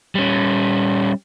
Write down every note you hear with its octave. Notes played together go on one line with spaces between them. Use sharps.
G3 C#4